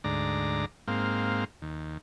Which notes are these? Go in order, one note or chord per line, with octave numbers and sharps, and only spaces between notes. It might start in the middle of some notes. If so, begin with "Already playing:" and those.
D2 G#2 D5 A#5
G#2 A#3 C4 F5
D#2